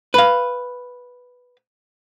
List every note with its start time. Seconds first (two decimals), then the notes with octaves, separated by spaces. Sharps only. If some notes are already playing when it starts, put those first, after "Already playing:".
0.14 B4 F5